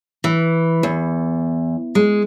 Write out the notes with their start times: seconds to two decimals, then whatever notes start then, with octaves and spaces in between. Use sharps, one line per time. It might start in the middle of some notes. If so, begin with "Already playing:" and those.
0.24 E3
0.83 E2
1.95 G#3